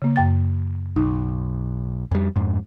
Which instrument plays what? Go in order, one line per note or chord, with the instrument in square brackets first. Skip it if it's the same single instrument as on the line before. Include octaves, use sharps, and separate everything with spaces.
[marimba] C#3 A#3
F#2 G5 A6
[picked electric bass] B1 [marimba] D#4
[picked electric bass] F2 G3
F2 G#2